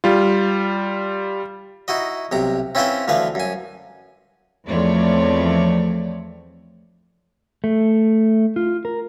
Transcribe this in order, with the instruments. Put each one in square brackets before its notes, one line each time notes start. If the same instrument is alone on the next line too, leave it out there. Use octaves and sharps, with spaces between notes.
[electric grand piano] G3 F4
[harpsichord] D#4 E4 F#4 D#5
B1 C3 A#5
C4 C#4 E4 F4 B4 C5
D2 E3 F3 B4 F5
F#2 G#5
[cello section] E2 F3 A3 C4 C#5 D5
[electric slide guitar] A3
F4
A#4